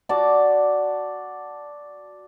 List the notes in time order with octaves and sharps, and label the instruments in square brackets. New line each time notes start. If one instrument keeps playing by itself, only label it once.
[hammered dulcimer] F#4 D5 A5 D6